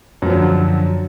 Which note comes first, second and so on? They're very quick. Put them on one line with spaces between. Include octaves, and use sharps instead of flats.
F#2 F3 F#3 D3